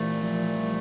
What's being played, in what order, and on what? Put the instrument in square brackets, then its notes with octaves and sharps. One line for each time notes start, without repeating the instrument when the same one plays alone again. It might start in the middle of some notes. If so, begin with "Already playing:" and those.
Already playing: [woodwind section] C2 A#2 A3 [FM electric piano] E3
[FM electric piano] F3
G3